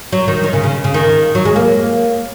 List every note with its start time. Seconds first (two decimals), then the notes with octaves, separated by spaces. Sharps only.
0.12 F#3
0.28 D#3
0.43 D#3
0.53 C#3
0.64 C#3
0.84 C#3
0.94 D#3
1.35 F#3
1.45 G#3
1.56 A#3